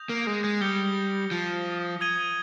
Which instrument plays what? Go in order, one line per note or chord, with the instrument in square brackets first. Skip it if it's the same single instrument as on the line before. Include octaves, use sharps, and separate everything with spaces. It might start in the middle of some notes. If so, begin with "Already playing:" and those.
Already playing: [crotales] D#6 G6 A#6 F7
[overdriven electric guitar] A#3
G#3
G#3
[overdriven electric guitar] G3 [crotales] D#6 G6 A#6 C#7 G7
[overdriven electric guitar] F3
[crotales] D#6 G#6 D#7 G7